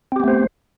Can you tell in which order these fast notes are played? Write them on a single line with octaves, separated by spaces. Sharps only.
C4 G4 B3 A3 C5